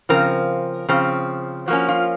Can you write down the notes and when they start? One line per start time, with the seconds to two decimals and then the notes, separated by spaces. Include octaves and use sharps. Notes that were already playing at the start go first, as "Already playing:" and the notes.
0.09 C#3 F3 C4 A#4
0.89 C#3 F3 C4
1.68 F3 A#3 C#4 F#4
1.89 F4